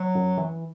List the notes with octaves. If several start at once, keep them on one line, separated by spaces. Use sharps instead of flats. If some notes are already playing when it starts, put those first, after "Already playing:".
Already playing: F#3
F#2
E3